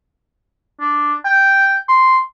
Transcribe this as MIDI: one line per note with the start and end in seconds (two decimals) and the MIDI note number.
0.80 1.14 62
1.25 1.76 79
1.88 2.20 84